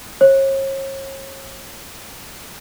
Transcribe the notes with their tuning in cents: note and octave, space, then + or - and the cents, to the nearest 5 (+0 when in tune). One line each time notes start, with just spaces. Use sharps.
C#5 -40